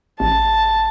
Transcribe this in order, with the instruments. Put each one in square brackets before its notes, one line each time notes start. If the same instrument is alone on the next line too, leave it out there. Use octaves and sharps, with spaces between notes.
[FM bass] A1 [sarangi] A5